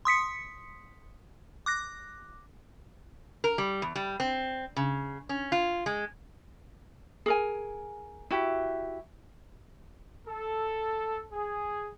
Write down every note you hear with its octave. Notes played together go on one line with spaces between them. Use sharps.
C6 D#6 B6 C#7
D6 F#6 A#6
A#4
G3
E2
G3
C4
C#3
C#4
F4
G#3
G#4 A#4 G#5
E4 F#4 G4
A4
G#4